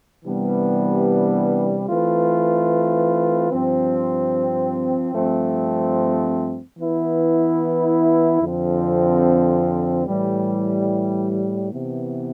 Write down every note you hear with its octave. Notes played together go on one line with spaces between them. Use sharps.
C3 E3 G3 B3 D4
E3 A3 C4 F4 B4
G2 F3 C4
G2 F3 A3 C4
E3 B3 E4 B4
F2 D3 F3 C4
A2 E3 G3
C3 E3 B3